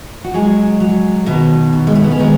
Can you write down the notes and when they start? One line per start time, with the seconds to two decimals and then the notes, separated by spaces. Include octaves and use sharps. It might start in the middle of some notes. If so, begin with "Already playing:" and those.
0.24 F#4
0.34 F#3 G#3 G#4
0.80 F#3
1.26 B2 D#3 D#4
1.73 B2
1.87 G#3
1.95 A3
2.03 B3
2.11 C#4
2.19 D#3 G#3 D#4